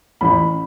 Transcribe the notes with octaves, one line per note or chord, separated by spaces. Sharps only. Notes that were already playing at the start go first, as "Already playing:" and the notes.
A1 B5